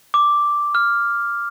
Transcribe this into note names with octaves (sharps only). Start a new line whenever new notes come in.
D6
F6